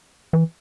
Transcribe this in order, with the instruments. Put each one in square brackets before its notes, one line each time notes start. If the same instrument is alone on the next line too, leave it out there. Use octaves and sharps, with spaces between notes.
[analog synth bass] E3